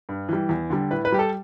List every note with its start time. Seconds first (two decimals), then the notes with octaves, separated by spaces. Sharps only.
0.09 G2
0.29 E3 G3
0.49 E2
0.70 D3 G3
0.91 A2 B4
1.05 B4
1.12 G3 G4
1.19 A4